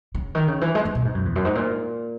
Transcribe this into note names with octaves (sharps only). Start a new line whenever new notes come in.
C#3
D#3
C#3
E3
G#3
G#3
B2
G#2
F#2
E2
F#2
G#2
A#2